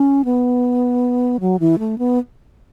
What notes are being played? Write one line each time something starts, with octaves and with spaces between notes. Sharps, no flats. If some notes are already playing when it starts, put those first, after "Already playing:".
Already playing: C#4
B3
F#3
E3
A3
B3